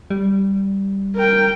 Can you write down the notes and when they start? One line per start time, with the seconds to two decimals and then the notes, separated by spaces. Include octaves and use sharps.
0.10 G3
1.16 A#4 G5